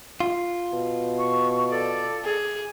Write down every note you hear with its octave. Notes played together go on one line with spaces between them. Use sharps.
F4
B2
C#6
A4 D5
G#4